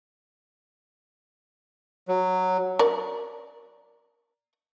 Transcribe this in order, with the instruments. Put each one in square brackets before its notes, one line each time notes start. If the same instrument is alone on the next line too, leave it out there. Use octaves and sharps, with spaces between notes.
[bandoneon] F#3
[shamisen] A#4 D5